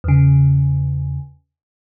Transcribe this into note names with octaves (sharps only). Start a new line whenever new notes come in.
E2 C#3